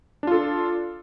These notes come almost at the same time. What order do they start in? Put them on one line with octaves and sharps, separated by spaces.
D4 F4 A4